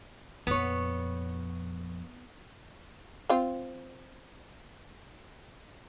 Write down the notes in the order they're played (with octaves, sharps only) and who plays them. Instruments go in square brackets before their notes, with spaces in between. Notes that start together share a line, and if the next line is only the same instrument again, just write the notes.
[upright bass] F2 A#2 [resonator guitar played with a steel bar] B3 C#5
[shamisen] C4 F4